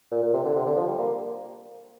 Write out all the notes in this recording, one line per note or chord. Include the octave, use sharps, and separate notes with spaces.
A#2
A#2
C3
D3
C3
D3
F3
G3
A#3